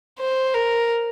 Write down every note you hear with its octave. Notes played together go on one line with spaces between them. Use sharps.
C5
A#4